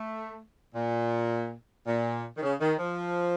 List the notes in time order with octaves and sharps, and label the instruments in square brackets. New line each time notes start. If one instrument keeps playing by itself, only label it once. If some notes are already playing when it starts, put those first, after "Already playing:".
Already playing: [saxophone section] A3
A#2
A#2
D#3
C#3
D#3
F3